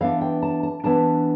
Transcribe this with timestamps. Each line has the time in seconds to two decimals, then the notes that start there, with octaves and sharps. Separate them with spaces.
0.01 E3 B3 D4 F5
0.21 G5
0.43 A5
0.63 A5
0.84 E3 B3 D4 A5